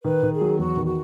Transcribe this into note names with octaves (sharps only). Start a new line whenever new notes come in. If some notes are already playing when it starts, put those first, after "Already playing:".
D#3 B4
D#3
G#4
F#3
E2 F#4
D#3
F#4